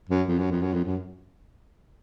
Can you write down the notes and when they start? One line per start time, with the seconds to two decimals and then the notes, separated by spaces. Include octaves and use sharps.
0.09 F#2
0.28 F2
0.39 F#2
0.51 F2
0.62 F#2
0.73 F2
0.85 F#2